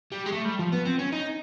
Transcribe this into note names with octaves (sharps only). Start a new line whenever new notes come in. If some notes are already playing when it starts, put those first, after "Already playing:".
G3
G#3
A3
G3
F3
B3
C4
C#4
D#4